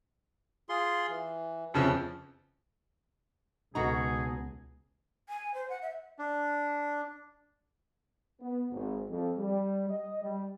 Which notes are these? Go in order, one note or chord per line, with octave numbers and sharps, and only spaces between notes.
F4 G#4 C6
E3
F2 C#3 E3 F3 E6
C#2 B2 D#4 F#4 G#4 A4 A#5
G#5
C5
F#5
E5
D4
B3
G#1
F2
G3
D#5
G3